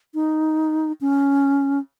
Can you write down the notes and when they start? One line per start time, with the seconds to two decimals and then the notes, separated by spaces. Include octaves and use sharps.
0.14 D#4
1.01 C#4